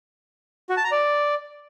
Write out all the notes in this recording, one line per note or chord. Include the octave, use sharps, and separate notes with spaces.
F#4
A5
A#5
D5